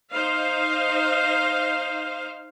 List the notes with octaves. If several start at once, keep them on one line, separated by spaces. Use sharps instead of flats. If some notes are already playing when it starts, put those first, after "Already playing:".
D#4 C5 F5